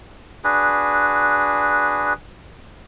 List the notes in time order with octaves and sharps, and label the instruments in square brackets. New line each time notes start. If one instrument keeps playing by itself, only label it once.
[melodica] D4 F#4 G#4 B4